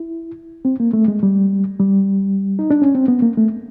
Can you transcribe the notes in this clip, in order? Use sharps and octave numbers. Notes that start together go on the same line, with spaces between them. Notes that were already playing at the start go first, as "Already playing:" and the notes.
Already playing: E4
C4
A#3
A3
G#3
G3
G3
D#4
D4
C#4
C4
B3
A#3
A3